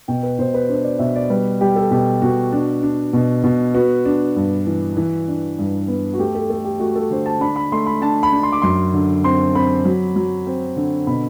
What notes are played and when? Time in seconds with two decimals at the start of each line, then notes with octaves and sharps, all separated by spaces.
0.08 B2 G5
0.23 B4
0.39 B2 C5
0.54 B4
0.69 D4 C5
0.84 D5
0.99 B2 E5
1.16 D5
1.30 G3 B4
1.61 G3 G4
1.76 A4
1.91 B2 G4
2.22 B2 F#4
2.52 D4
2.83 D4
3.13 B2
3.44 B2
3.74 B3 F#4
4.05 D4
4.36 G2
4.66 E3
4.97 E3
5.28 D4
5.58 G2
5.88 B3
6.13 F#4
6.18 A3 G4
6.35 A4
6.50 A3 A4
6.64 G4
6.79 A3 F#4
6.96 A4
7.10 D3 C5
7.26 A5
7.41 D4 B5
7.56 B5
7.72 A3 C6
7.86 B5
8.02 D4 A5
8.23 B5
8.33 D4
8.43 C6
8.52 D6
8.62 F#2 C6
8.94 D3
9.24 C4 C6
9.55 C4 B5
9.85 F#3
10.16 F#3
10.47 C4
10.76 D3
11.07 B2 B5